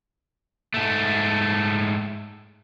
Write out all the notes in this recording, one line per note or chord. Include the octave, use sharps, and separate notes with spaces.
G#2 A3